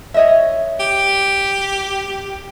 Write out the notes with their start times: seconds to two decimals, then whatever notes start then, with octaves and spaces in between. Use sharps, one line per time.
0.14 C#5 D#5 E5
0.80 G4